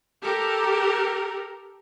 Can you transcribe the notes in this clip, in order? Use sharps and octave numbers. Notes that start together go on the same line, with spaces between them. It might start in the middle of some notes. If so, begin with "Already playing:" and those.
G4 A4 A#4